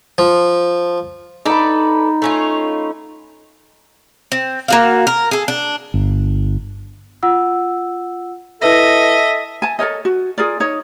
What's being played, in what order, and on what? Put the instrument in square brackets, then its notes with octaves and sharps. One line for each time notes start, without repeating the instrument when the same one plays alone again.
[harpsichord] F3
[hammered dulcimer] D#4 B5 [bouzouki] A4 B4 D5
[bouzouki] A3 C#4 F4
C4
A#3 F#4 F5
A#4
G#4 A4
D4
[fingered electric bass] G1
[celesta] F4 F#5 E6
[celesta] E4 B4 A#6 [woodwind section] A4 E5 [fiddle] D#5
[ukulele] G#5 A5
A4 A#4 C#5 D#5
F#4
F4 G#4 A#4 D5
D#4 C#5 D#5